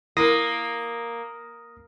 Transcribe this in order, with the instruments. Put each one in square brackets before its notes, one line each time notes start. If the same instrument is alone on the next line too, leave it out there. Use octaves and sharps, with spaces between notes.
[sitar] A#3 [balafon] E4 A#4 [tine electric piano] D#6 A#6 C7